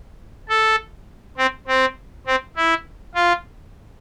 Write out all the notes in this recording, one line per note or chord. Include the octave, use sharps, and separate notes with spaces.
A4
C4
C4
C4
E4
F4